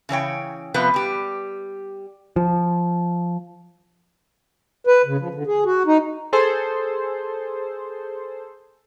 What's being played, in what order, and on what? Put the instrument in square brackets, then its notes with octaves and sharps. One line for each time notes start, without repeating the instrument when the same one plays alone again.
[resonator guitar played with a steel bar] C#3 E3 C#5 G5
C3 F3 B3 F4 B4
G3 G4
[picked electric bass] F3
[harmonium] B4
C#3
F3
D3
G#4
F#4
D#4
[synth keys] G#4 A4 C5